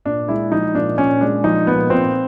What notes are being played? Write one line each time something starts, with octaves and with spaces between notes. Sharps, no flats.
A#2 D4
G#3 E4
F3 D#4
A#2 D4
A#2 C#4
G#3 D4
F3 D#4
A#2 B3
A#2 C4